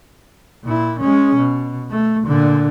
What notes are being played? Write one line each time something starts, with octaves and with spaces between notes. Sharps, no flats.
A#2 E4
G#3 C#4
B2
A3
A#2 D3